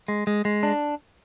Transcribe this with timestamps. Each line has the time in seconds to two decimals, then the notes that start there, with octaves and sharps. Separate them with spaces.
0.08 G#3
0.27 G#3
0.45 G#3
0.63 D4